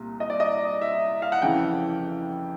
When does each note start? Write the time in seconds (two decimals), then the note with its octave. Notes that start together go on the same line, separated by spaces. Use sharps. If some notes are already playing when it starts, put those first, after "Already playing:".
Already playing: C2 A#2
0.20 D#5
0.30 D5
0.40 D#5
0.82 E5
1.22 F5
1.32 F#5
1.42 F2 C#3 E3 G5